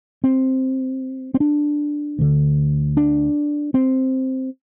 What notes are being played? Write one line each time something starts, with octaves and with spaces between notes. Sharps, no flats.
C4
C4
D4
D2 D3
D4
C4